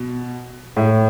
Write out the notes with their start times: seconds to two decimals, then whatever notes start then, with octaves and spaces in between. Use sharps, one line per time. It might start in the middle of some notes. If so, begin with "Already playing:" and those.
Already playing: B2
0.77 A2